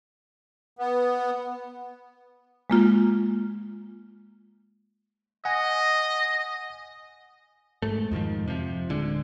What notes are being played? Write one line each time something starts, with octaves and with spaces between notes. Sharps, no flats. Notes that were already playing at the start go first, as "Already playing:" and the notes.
B3
G#3 A#3 F4
D#5 F#5 G#5
G#2 A3
F2 G#2 D#3 F3
C3 F3
D1 D3 G#3